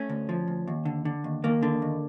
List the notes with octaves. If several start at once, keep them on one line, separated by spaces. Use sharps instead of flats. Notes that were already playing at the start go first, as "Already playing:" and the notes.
Already playing: A3 C#4
D2
F3
D2
D#2
D3
D3
D#2
D#2 A#3
D3
D#2